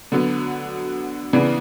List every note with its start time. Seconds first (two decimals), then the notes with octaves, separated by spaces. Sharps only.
0.12 D3 F#3 B3
1.33 C#3 E3 B3 D4